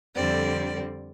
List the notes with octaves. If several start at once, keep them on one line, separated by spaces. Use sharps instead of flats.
F2 D3 G3 C4 D5